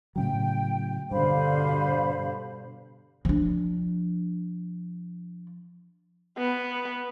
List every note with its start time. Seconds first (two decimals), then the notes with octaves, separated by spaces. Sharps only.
0.16 A2 C#3 F#3 G5
1.11 G2 B2 D3 G3 C5 F5 B5
3.25 F3 D4
6.38 B3